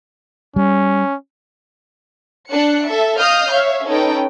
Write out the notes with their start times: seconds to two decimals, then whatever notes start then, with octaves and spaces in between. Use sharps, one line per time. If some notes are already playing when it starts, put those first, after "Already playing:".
0.56 G3 C#4
2.49 D4 F#6 C#7
2.87 A4 E5
3.18 D#5 F5 D#6 F6 G6
3.52 C#5 E5 F5
3.87 C#4 D#4 A4 B4 G5